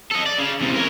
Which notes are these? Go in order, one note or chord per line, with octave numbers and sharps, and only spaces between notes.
A4 D#5
D5
C#3
E2 C3
A#4 C#5